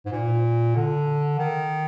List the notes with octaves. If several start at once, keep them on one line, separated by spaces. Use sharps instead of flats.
G#2
A#2
D3
D#3